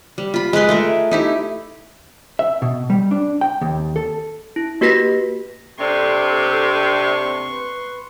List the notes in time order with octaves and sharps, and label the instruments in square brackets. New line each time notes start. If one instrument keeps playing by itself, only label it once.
[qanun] G3
F4 B5
G#3 G#4 B4 C6
A3 G#4 A#4
D#4 E4 G4
[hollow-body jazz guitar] E5
B2
G3
D4
G5
D#2
A4
[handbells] E4
A#3 F#4 G4 B4 A#6 B6
[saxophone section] C3 D4 [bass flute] A4 [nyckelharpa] C6 C#6
[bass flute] B4